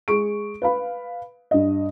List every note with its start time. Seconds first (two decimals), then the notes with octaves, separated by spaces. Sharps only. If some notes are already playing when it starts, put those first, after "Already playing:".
0.08 G#3 C#6 D7
0.62 B4 F5 B5
1.51 G2 D#5